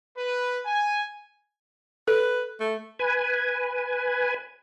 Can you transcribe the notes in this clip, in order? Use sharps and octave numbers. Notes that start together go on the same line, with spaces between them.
B4
G#5
A4 B4
A3
B4 G#5